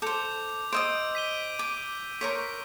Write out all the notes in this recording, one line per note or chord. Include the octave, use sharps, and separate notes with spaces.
A4 C5 D6 G6 F7
C5 D#5 D#6 E6 G6 D7
B6 D#7 G7
D6
A#4 C5 C#5 B6